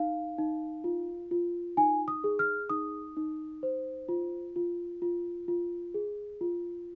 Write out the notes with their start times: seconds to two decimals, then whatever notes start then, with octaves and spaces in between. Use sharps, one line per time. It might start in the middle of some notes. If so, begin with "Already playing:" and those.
Already playing: D#4 F5
0.38 D#4
0.84 F4
1.31 F4
1.77 D#4 G#5
2.08 D#6
2.24 G#4
2.39 F6
2.70 D#4 D#6
3.17 D#4
3.63 C5
4.09 F4
4.56 F4
5.02 F4
5.48 F4
5.94 G#4
6.41 F4